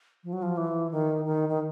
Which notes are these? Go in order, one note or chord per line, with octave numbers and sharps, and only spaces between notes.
F3
F#3
F3
E3
D#3
D#3
D#3